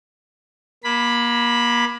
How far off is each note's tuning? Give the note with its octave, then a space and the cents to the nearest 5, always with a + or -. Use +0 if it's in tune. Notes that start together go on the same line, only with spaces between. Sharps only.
A#3 +30 B5 +0